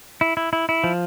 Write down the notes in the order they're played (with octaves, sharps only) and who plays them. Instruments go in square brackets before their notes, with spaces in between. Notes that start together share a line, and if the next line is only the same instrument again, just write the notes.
[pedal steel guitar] E4
E4
E4
E4
F3